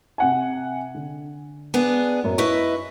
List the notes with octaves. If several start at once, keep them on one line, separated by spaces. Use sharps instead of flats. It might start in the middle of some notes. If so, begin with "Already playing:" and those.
C3 F#5 G#5
D3
B3 D4 G#4
F#2 A2
E4 B4 D#5 C#6